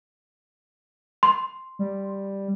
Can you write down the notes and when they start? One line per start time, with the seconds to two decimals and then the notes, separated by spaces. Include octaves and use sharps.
1.23 C6
1.79 G3